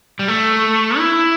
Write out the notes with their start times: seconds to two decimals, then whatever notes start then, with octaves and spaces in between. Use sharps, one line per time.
0.19 G3
0.28 A3
0.98 E4